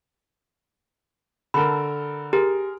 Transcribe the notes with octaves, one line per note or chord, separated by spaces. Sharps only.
D3 A4 A#4 B5
G4 G#4 A#4